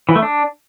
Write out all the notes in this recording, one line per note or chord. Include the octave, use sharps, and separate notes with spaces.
E3
A3
D4